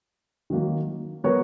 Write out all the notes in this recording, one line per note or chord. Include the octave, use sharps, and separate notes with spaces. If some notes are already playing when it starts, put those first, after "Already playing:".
D#3 F#3 A#3
F#3 B3 F#4 A#4 C#5